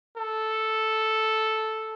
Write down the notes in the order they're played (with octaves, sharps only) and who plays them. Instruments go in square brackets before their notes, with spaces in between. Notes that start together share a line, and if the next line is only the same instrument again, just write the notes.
[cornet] A4